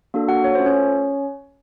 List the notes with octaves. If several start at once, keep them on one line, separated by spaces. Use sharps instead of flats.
A#3 D4 F#4 A4
F#4 F#5
C#5
A3 C#4 F4 A4 C5
C#4 C#5